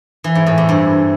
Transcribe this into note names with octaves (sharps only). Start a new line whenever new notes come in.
E3
G#2
A2
C3
G2